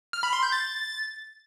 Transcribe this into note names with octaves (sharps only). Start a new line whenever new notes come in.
F6
B5
C6
G6
A6